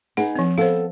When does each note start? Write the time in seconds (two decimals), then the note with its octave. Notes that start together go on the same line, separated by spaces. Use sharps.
0.17 D#4 G#4 B4 F#5
0.35 F3 C4
0.58 B3 A4 C5 F5